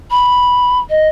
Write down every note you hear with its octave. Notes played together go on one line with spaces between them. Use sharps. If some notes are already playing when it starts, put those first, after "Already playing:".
B5
D#5